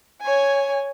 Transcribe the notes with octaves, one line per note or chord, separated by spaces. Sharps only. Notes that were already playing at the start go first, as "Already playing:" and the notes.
C#5 G#5